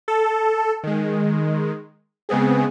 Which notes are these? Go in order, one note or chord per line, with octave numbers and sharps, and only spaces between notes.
A4
D#3 G#3
C#3 G#3 B3 C4 G#4